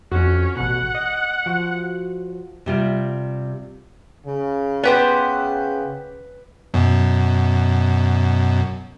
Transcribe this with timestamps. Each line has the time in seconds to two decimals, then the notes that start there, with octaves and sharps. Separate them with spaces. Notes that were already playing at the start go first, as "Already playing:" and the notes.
0.12 F2 C#4 F#4
0.57 A1 B2 F#5
0.95 D#5
1.46 F3 F#4
2.66 C3 G3 F4
4.26 C#3
4.84 B3 G4 B4 C5
6.74 F#2 B2